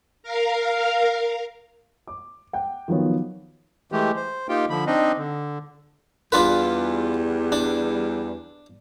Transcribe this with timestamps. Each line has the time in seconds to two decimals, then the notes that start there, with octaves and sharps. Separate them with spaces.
0.23 A#4 F5
2.07 D6
2.53 F#5 G5
2.88 D#3 F3 F#3 B3
3.92 E3 G#3 A3 G4
4.16 C5
4.49 A#3 D#4 F4 G4 G5
4.70 D3 F3 B5
4.87 C4 D4 D#4 D#5
5.17 D3
6.32 E2 G3 D4 F4 B4
7.52 D4